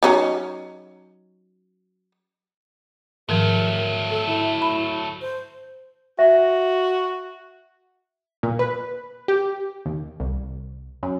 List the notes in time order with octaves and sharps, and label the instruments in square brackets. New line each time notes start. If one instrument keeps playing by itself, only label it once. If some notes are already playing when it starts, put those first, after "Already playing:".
[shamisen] F#3 C#4 D#4
[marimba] G#2 D#3 F3 [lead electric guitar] F#3 A3 [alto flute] A#4
[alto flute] A4
E4
[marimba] B5
[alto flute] C5
[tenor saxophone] F#4 [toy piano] E5
[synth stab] A#2
B4
G4
D#2
C2
F#2